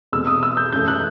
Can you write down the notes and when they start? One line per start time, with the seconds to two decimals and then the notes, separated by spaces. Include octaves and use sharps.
0.12 E2 B2 A3 C4 E6
0.27 D#6
0.43 E6
0.57 G6
0.72 F#2 E3 A3 G6
0.88 F#6